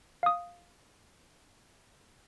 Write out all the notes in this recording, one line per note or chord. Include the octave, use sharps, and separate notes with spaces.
F5 D#6